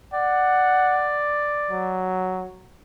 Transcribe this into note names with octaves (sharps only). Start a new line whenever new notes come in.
D5 F#5
F#3